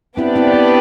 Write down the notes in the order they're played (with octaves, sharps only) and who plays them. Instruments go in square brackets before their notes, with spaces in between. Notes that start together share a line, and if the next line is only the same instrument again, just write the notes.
[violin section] B3 D4 G4 B4 D5 [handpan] C4 E4
[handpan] C4 E4
C4 E4